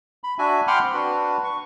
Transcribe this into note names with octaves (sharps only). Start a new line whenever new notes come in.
B5
D4 F#4 E5 G#5
F#5 G5 B5 C6 D6 F6
C4
D4 F#4 B4
C#6